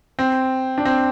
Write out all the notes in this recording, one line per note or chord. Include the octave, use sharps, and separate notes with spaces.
C4
D4
C4